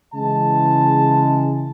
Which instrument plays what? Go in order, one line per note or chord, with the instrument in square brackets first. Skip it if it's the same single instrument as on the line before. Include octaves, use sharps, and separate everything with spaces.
[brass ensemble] C#3 E3 G#3 A5